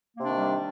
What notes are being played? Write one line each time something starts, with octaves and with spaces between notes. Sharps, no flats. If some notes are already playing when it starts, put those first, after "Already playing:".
C3 D#3 G3 A#3 D4